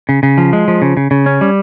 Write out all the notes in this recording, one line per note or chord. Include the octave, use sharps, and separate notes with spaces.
C#3
C#3
F3
G#3
F3
C#3
C#3
C#3
C#4
G3